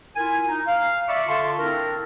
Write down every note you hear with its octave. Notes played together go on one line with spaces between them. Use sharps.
E4 F4 A#4 G#5
D#4
F5
D5 E5 B5 C#6 D6
D3 F4 F5 A5 C6 C#6
C4 D4 E4 A#4